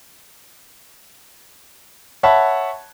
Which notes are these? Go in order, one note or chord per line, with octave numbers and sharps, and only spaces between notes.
C#5 E5 F#5 A5 B5